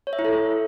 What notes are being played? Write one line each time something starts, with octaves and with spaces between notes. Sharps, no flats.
C#5
E5
E4
A4